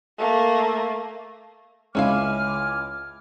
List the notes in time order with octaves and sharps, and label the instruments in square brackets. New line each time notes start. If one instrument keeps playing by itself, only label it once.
[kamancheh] A3 A#3
[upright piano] C#2 G#3 [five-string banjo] C#4 E4 F5 [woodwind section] G#5 D6 F6